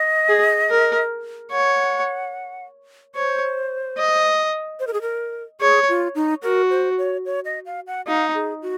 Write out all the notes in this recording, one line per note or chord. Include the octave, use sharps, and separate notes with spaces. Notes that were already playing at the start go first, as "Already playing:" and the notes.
Already playing: D#5
G#4
A#4
C#5 F#5
C5 C#5
D#5
C5
A#4
G#4
A#4
G#4 C#5
F4
D#4
F#4 A#4
C5
C#5
C#5
D#5
F5
F#5
D#4 F5
G#4
F#4